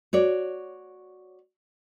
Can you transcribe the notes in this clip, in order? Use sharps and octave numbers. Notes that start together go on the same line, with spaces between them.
F#4 C#5 D5